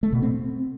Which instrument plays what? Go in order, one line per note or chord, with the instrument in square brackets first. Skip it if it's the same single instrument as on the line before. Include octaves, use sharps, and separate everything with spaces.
[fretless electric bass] A3
B2
C4